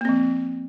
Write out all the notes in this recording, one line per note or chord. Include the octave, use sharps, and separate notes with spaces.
F3 A#3 C4